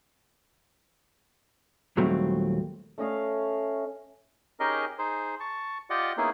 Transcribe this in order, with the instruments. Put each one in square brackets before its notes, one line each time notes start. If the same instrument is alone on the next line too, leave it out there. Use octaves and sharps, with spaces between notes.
[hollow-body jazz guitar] D#2 A#2 F#3 G3 A3 C4
[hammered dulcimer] A3 C#4 D#5 F5
[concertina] C#4 D#4 G4 G#4 A#4 D#5
D#4 G#4 C5
A5 C#6
F4 G4 D5 D#5 F#5
A#3 B3 C#4 D#4 E4 G#4